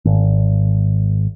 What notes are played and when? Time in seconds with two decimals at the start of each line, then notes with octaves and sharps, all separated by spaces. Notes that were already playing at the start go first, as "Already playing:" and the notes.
0.05 G#1